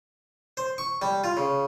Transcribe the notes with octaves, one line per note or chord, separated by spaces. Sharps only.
C5
C#6
G3
F4
C#3